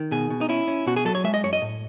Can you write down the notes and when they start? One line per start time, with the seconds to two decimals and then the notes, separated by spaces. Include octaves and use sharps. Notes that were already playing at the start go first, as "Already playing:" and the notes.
Already playing: D#3
0.11 B2 G#4
0.30 B2
0.41 D#4
0.49 C#4 E4
0.68 C#4
0.87 B2 F#4
0.96 G#4
1.05 F#3 A4
1.15 C#5
1.24 G#3 E5
1.34 D#5
1.43 F#2 C#5
1.53 D#5
1.62 A2